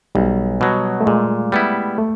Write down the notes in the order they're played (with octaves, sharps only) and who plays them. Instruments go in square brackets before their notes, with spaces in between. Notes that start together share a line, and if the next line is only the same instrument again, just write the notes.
[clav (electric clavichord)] B1 [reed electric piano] G3
[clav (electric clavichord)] B2 F#3
[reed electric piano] A3
[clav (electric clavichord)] A#2 [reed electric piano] G#3
[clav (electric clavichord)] G3 B3 E4
[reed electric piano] A3